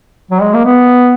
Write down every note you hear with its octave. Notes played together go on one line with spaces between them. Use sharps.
F#3
G#3
A#3
B3